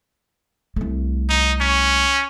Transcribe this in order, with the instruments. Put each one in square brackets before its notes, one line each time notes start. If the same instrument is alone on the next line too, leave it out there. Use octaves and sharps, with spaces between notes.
[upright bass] C2 A3
[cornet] D#4
C#4